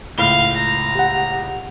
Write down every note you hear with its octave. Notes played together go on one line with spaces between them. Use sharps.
C#2 A2 F5 G7
A#5
G4 F#5